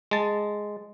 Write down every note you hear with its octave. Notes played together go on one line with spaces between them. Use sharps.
G#3 A5